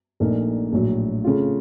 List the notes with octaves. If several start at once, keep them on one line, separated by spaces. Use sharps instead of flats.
A#1 A#2 A3 D#4 A#4
A#1 A2 F#3
C#3 A3 C4 F4